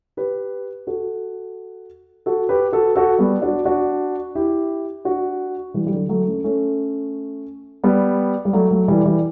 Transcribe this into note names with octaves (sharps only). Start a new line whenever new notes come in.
G4 B4
F#4 A4
F#4 A4
G4 B4
F#4 A4
F#4 A4
G3 B3
D4 F#4
D4 F#4
E4 G4
D4 F#4
E3 G3
G3
D3 F#3
F#3 A3
A3 C#4
A3 C#4
G3 B3
G3
F#3 A3
F#3 A3
E3 G3
E3 G3